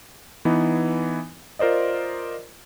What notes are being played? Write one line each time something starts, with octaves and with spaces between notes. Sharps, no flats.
E3 B3 D#4
F4 A#4 C5 D5 D#5